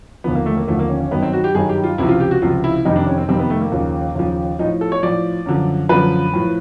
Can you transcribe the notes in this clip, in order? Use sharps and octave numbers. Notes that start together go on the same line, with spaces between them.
D#2 D3 F3 B3
A#3
A3
A#3
D#2 D3 F3 A3
A#3
C#4
C#4
G2 D#3 F#3 B3
C4
F#4
G4
G2 D#3 F#3 G#4
G4
F4
C#2 C3 F3 E4
F4
G4
F#4
C#2 C3 F3 F4
E4
F2 C3 D#3 G3 D#4
D4
C#4
C4
F2 C3 D#3 G3 C4
B3
A3
A#3
D#2 C#3 F3
D#2 C#3 F3
A2 F3 D#4
A4
C#5
A2 F3 D5
F#2 D3 F3
F#2 D3 F3 B4
A2 F3